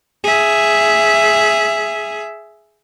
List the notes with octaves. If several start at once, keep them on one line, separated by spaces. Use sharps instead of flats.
G#4 E5